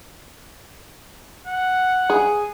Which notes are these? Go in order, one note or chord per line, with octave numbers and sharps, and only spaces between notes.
F#5
G#4